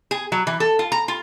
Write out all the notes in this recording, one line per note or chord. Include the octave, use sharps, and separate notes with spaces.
G#4
F#3
E3
A4
F4
A#5
F4